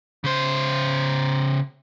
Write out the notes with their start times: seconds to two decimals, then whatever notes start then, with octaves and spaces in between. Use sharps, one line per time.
0.24 C#3 C5